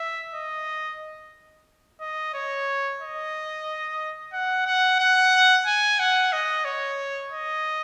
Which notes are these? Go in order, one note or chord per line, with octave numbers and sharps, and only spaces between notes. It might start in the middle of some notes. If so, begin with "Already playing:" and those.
Already playing: E5
D#5
D#5
C#5
D#5
F#5
F#5
F#5
G#5
F#5
D#5
C#5
D#5